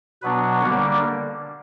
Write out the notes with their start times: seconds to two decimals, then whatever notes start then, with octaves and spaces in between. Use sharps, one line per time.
0.22 B2 F#3 B3 D4 B4
0.61 D3 G3 A#3 D4 C#5